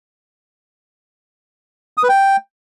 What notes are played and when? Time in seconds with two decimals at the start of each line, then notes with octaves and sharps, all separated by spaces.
1.97 D#6
2.03 B4
2.09 G5